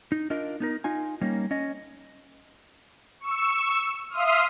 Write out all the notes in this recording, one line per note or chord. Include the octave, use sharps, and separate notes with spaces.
D#4
D4 F4 A#4 D#5
B3 D#4 A#4
D#4 F4 G#5
G3 A#3 C#4 D#4
C#4 D#5
C#6 E6
E5 F5 C6 D#6 F6